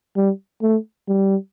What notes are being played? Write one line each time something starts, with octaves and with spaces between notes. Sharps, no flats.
G3
A3
G3